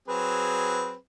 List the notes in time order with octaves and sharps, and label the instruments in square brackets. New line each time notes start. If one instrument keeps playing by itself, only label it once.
[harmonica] F#3 C4 G#4 [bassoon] B4